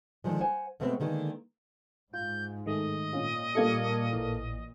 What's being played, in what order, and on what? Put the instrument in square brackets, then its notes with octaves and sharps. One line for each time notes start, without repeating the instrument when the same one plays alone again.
[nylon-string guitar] D3 D#3 F3 G#3
C5 F#5 G#5
B2 G#3 A3 B3 C4
D3 D#3 G#3 A#3
[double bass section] G#2 [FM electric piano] F4 [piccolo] G6
[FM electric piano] D#3 G#3 A3 [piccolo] D#5
[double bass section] A#2 [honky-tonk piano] C#4 F4
[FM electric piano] G3 G#6 C#7 [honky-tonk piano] A#3 F4 A4
[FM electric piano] A1 E3